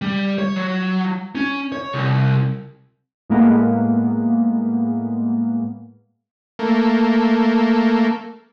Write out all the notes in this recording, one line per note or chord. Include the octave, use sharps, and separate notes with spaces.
G3
C#5
F#3
C#4
C#5
C2
A2 G#3 A#3 B3
A3 A#3